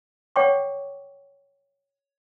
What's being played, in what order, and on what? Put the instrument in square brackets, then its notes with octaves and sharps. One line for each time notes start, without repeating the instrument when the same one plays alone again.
[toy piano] C#5 F#5 G5 C#6 D6